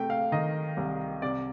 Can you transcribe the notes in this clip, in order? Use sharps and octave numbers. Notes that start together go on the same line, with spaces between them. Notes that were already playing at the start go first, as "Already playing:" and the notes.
Already playing: C3 A3 G5
F5
D#3 D#5
C2
C3 D5